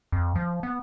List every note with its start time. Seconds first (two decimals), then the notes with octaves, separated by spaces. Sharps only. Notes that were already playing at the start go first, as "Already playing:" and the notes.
0.12 F2
0.36 F3
0.63 B3